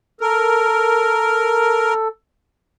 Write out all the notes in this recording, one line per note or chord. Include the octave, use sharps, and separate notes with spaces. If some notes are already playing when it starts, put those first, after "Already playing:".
A4 A#4